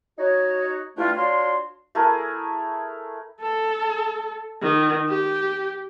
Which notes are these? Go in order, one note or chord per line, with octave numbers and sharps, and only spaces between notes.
D#4 F#4 C#5
E3 G3 A3 D4 E4 F4
D4 F4 F#4 C#5 C6
A3 E4 G#4 A#4
A4
D#3
G4